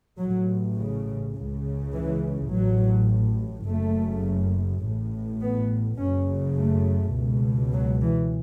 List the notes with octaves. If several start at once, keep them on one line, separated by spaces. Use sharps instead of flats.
A1 A2 F#3
C#3
C#2 C#3
E3
A1 A2 F#3
F#1 F#2 C#3 A3
A1 A2
B3
F#1 F#2 C#3 C#4
A3
C#2 B2
F#3
E3